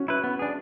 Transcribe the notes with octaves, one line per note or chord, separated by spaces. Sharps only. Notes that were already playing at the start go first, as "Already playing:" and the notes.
Already playing: C#4 F#4
E4 B4
B3
D4 G#4